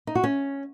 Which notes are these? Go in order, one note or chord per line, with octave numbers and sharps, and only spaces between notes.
D#4
F#4
C#4